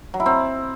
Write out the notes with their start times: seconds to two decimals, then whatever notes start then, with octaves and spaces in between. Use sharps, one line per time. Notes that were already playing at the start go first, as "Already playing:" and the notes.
0.14 F#3
0.20 E4
0.26 C4